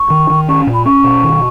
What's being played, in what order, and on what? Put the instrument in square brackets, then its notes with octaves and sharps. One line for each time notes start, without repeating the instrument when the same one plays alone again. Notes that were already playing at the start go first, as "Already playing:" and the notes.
Already playing: [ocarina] C#6
[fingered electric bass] D#3
D#3
[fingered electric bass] C#4 [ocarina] C#6
[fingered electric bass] A#2
[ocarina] B5
[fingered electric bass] C#4 [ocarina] C#6
[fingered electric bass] B2
D#3